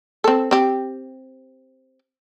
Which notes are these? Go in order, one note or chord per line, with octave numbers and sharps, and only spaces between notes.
C4 A4
C4 G4